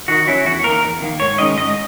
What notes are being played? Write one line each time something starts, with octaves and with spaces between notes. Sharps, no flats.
D#3 F#4
F#3 C#4 E4
E2 F#4
D#3 A#3 A#4
E2
D#3 A#3
G#2 C#5
D#3 G#3 C#4 D#5
G#2 D#5